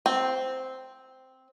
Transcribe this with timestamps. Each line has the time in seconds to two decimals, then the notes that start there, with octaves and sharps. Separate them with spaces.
0.06 C4